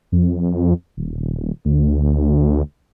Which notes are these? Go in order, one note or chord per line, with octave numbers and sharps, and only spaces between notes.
F2
D#1
D2